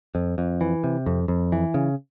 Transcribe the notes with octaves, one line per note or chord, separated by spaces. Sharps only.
F2
F2
E3
C3
F2
F2
E3
C#3